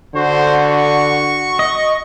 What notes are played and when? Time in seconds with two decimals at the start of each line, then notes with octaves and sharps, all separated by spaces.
0.15 D3 F#4 C5
0.68 C#6
1.59 D#5